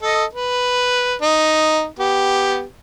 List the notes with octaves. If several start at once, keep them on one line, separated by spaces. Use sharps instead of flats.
A4 D#5
B4
D#4
B3 G4